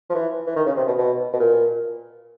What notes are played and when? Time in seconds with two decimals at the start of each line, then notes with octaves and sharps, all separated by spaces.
0.10 F3
0.15 E3
0.47 E3
0.56 D#3
0.66 C#3
0.77 C3
0.87 B2
0.98 B2
1.33 B2
1.40 A#2